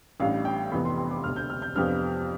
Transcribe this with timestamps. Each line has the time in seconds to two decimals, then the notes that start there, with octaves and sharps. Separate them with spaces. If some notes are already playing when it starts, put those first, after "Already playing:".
0.20 A1 A2 G3 D4 F5
0.45 G5
0.72 F1 F2 C3 E3 B3 B5
0.85 C6
0.98 C6
1.11 D6
1.24 E1 D2 C3 F6
1.36 G6
1.50 F6
1.62 G6
1.75 F2 C3 F3 B3 D4 F6